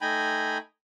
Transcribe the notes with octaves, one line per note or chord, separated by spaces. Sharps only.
A3 D#4 G5 G#5 A#5 B5